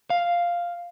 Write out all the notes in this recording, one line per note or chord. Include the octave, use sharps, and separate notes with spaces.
F5